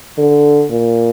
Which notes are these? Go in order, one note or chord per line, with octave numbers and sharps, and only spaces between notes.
D3
A#2